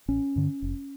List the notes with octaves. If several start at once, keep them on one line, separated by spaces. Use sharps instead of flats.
A1 C#4
G2 D3
F1